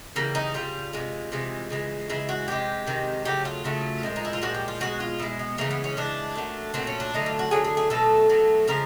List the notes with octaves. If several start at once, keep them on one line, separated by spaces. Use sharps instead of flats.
C#3 E3 G3 A#3
D#4
C#3 E3 G3 F4
C3 E3 G#3
C3 E3 G#3
C#3 E3 G#3
C#3 E3 G#3 E4
F#4
C3 D#3 G#3 G4
C3 D#3 G#3
C#3 F#3 A3 G4
F4
C#3 F#3 A3
A#2 F3 G#3
D#4
E4
F4
A#2 F3 G#3 F#4
G4
F4
B2 G#3 F#4
F4
B2 G#3 E4
B3
C#3 E3 G#3 A#3
B3
C#4
C#3 E3 G#3 D4
A#2 F#3 A3
A#2 F#3 A3 C4
C#4
D4
D3 F#3 A3 D#4
F4
F#4
D3 F#3 A3 G#4
G#4
G#4
B2 F#3 A3 A4
B2 F#3 A3
C#3 F3 G#3 A#4